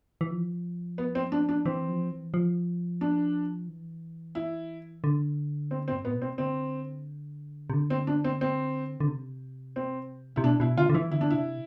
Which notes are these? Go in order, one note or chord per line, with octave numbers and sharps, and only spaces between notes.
E3
F3
B3
C4
D4
D4
E3 C4
F3
E3
F3
D4
E3
E4
D3
C4
C4
G2
A2 B3
B2
C4
C3
D3 C4
C3
D3
C4
D4
C4
C4
D3
C3
C4
C3 E4
B2 D4
B2 E4
D3 F4
D3
E3 E4
D3 E4
D4
C3 E4